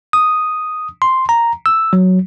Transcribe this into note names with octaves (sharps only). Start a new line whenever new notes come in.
D#6
C6
A#5
E6
F#3